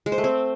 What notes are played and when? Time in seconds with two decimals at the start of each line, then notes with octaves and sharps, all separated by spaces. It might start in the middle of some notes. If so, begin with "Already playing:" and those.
0.06 G#3
0.12 C5
0.18 A3
0.24 C4